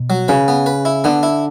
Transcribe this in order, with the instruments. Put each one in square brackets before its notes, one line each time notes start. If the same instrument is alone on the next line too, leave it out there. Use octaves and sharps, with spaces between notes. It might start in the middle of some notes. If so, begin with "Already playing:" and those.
Already playing: [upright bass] B2
[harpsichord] F#3
[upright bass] C#3 [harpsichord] B4
[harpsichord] B3
B4
E4
[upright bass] D3 [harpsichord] B3
[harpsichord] E4